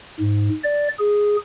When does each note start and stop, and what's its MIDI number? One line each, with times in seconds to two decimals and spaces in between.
0.20 0.49 44
0.64 0.88 74
0.99 1.37 68